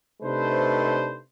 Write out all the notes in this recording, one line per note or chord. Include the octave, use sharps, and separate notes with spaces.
C3 A3 D4 D#4 B4 C5